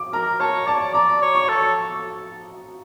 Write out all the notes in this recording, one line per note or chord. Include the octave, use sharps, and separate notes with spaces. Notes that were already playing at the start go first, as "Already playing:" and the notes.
Already playing: D6
A#4 A#5
C#5 A5
D5 A5
D5 A#5
C#5
C#6
A4